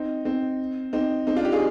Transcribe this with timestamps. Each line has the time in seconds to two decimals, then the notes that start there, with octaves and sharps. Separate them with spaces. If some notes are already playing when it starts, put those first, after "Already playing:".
Already playing: C4 D#4
0.25 C4 D#4
0.93 C4 D#4
1.27 C4 D#4
1.36 D4 F4
1.44 D#4 G4
1.52 F4 G#4